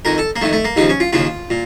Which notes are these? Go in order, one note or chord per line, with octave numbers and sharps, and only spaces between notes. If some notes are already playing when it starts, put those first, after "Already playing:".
F2 D#3 A#4
A4
A#3
F2 D#3 A3
A3
A#3
D#2 C#3 F3 D#4
C#4
F4
D#2 C#3 F3 F4
A#2